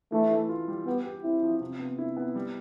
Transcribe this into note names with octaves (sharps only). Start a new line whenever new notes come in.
E3 A3
E3
F4
G3
B3 G4
G4
C4 E4
F3
C3
B3
E4
B3
G3